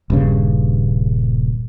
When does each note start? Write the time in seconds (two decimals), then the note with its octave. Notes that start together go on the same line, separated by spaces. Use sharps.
0.10 D#1 G2 C#3